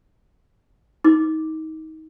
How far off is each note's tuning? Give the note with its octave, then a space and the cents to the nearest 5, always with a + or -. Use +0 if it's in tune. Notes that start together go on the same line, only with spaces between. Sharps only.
D#4 +25 D6 +0